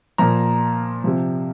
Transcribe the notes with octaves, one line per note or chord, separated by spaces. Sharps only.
A#2 F3 A#5
C3 F3